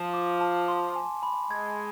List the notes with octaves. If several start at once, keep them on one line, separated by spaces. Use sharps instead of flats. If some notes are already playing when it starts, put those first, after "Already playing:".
Already playing: F3 E7
D6
A5
C6
G#5
B5
G#3 G#6